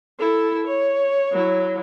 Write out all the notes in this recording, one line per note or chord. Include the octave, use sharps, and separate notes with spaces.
E4 A4
C#5
F#3 E4